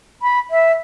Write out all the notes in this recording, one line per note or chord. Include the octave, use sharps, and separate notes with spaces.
B5
E5